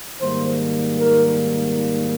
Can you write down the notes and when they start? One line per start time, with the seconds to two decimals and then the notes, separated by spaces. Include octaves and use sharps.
0.21 G#2 D#3 G3 A#3 C5
0.98 A#4